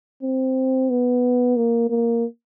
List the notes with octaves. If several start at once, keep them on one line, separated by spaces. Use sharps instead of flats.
C4
B3
A#3
A#3